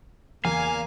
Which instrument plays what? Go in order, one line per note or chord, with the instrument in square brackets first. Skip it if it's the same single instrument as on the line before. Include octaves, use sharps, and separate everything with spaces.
[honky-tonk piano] E2 [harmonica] A#3 [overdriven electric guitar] F5 [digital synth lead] G#5